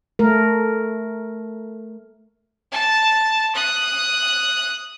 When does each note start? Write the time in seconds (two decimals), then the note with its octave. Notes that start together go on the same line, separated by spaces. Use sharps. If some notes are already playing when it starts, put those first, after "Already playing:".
0.19 A3 A#4
2.72 A5
3.55 D#6 F#6